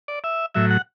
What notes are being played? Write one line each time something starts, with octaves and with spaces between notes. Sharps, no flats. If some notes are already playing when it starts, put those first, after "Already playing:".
D5
E5
A2 F#3 E5
F#5